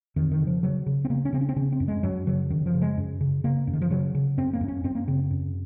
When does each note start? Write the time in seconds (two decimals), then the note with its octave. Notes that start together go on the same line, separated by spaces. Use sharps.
0.16 F2 D#3
0.32 D#3
0.40 C#3
0.47 F3
0.63 C#3 F#3
0.86 C#3
1.05 C4
1.10 C#3 A#3
1.25 C#4
1.33 C#3 C4
1.41 C#4
1.49 C4
1.56 C#3 C#4
1.72 C4
1.80 F#2
1.88 G#3
2.03 F#2 F#3
2.27 C#3 F#3
2.50 F#2 D#3
2.66 F3
2.74 C#3
2.82 G#3
2.97 F#2
3.21 C#3
3.44 C#3 A#3
3.67 F#2
3.73 D#3
3.82 F3
3.90 C#3 F#3
4.15 C#3
4.37 F#2 C4
4.53 A#3
4.61 F#2
4.68 C#4
4.84 F#2 C4
4.95 A#3
5.08 C#3 C4
5.31 F#2